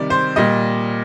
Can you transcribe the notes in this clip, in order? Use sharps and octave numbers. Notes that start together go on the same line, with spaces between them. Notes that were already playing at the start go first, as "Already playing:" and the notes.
Already playing: C3 D#3 G3 D5
C5
A#2 G3 D#5